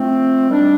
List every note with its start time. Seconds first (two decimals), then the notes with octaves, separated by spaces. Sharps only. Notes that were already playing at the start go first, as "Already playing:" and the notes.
Already playing: F3 A3 C4
0.49 D#3 G3 D4